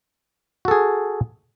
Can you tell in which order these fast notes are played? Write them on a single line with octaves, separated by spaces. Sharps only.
F#4 A4 G#4